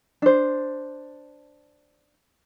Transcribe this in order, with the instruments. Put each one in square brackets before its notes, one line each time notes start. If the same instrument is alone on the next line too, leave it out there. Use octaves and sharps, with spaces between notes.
[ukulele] D4 C5